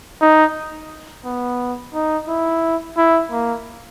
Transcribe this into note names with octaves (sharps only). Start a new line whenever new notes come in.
D#4
B3
D#4
E4
E4
A#3